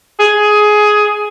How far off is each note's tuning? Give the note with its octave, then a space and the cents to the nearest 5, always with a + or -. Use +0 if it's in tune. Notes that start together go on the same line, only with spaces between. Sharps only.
G#4 +10